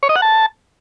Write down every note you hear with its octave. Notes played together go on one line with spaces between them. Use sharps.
C#5
D#5
F#5
A5